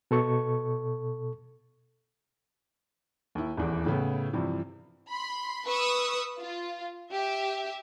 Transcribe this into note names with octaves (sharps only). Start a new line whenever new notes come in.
B2 A4 C#6
D#2 E4
D#1 E2 E3
A2 C#3 B3
G2 C3 E3 F3
B5 C6
B4 C#6 D#6 E6
F4
G4 E5